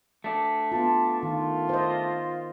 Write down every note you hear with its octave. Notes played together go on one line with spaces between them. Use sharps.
A3 D4
B3 F4 A5
D#3 F4
C5 D#5